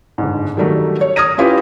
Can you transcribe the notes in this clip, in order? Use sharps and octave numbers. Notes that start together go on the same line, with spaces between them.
G1 G#2
D#3 F#3 G3 A3 A#4
C#5
D#6 F6 G#6 A#6 D#7
C#4 E4 F4 G4 B4